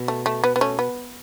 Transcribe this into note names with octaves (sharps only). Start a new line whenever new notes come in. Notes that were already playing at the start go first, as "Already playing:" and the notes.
Already playing: B2
A3
A3
B3
B3
A3 C#4
B3